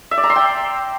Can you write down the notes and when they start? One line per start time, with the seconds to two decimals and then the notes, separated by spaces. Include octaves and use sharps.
0.11 E5
0.17 D5
0.24 A#5
0.30 C6
0.36 G5